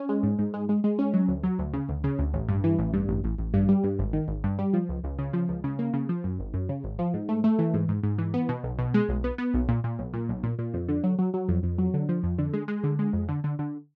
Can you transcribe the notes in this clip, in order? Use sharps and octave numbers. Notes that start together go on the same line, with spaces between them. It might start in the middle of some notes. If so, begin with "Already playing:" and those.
Already playing: C#4
G#3
G#2
G#2
G#3
G#3
G#3
C#4
F#3
D2
F#3
D2
C#3
D2
C#3
D2
A1
G2
E3
A1
G2
A1
A1
A1
G2
G3
G2
G#1
D#3
G#1
G2
G3
F3
C#2
C#2
C#3
F3
C#2
C#3
A#3
C#3
F3
F#2
G#1
F#2
C#3
G#1
F3
G#2
A3
A3
E3
G#2
G#2
G#2
E3
B3
B2
B1
B2
G#3
B1
B3
B3
B1
A#2
A#2
B1
A#2
B1
A#2
A#2
F2
D3
F#3
F#3
F#3
F2
F2
F#3
D3
F3
F2
D3
G#3
G#3
D3
G#3
F2
D3
D3
D3